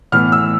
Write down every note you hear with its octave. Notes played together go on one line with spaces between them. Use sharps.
A2 E3 B3 F6
E6